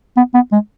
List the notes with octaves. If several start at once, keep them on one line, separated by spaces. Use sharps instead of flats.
B3
B3
G#3